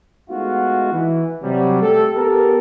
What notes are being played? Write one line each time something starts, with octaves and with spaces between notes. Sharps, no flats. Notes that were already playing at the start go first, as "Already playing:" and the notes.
G#3 A3 B3 D#4 F4 F#4
E3
C3 F#3 G3
A3 G4 A4
B3 G4 A4 A#4